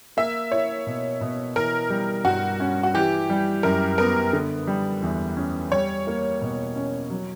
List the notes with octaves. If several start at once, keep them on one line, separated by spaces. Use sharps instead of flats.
A#3 E5
E4 C#5
B2
B2
E3 A#4
G3
G2 F#4
C#4
F#4
E3 G4
G3
F#2 A#4
B3 A#4
D3
G3
E2
C#4
G3 C#5
A#3
B2
C#4
F#3